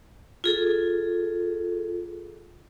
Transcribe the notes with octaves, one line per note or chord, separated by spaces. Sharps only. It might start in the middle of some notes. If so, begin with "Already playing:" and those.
F4 G#4 A4